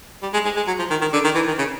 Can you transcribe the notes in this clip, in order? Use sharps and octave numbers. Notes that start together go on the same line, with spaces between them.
G3
G#3
G#3
G#3
F#3
F3
D#3
D#3
D3
D#3
E3
D#3
C#3